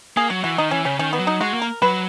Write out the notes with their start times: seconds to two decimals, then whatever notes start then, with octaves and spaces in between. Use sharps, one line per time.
0.17 A#3 G#4
0.30 F#3 F#4
0.44 E3 F#4
0.58 D#3 D#4
0.71 E3 C#4
0.85 C#3 C#4
0.99 D#3 C#4
1.13 B3
1.19 F#3
1.27 D#4
1.41 G#3 F#4
1.54 A#3
1.62 A#4
1.82 F#3 B4